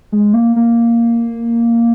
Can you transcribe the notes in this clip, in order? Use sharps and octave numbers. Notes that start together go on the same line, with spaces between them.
G#3
A#3
A#3